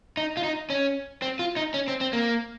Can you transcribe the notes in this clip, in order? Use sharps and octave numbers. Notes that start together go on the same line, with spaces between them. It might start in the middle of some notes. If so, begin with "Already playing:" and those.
D#4
F4
D#4
C#4
C4
F4
D#4
C#4
C4
C4
A#3